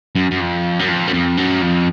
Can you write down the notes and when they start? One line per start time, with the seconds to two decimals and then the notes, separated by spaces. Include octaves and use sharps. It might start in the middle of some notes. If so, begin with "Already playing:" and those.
0.15 F#2
0.31 F#2
0.40 F2
0.79 F#2
0.88 F2
1.08 F#2
1.13 F2
1.38 F#2
1.62 F2